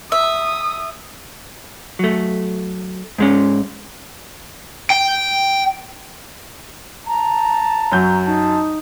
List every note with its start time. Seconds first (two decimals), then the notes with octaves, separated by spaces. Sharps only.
0.12 E5 D#6
1.99 F#3 A3
3.18 G#2 G#3 C#4
4.90 G5
7.07 A5 A#5
7.92 F#2 F#3 G6
8.26 D#4 A5